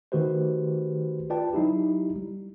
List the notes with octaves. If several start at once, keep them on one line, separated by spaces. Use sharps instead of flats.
D#3 A3 F#4 G4 B4 C5
F4 B4 D5 G5 A5
F#3 D#4 E4 G4
G3